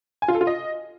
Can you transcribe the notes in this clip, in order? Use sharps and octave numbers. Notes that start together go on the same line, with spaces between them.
G#5
F4
A4
F4
D#5